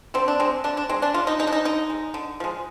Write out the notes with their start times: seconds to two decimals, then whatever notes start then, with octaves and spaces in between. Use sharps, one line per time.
0.14 D3 C4
0.28 D4
0.40 G#3 C4
0.64 D3 D4
0.77 D4
0.89 G#3 C4
1.02 D4
1.14 D3 F4
1.27 D#4
1.39 G#3 D#4
1.47 D4
1.53 D#4
1.65 D3 D#4
1.90 G#3
2.14 D3
2.40 F3 G#3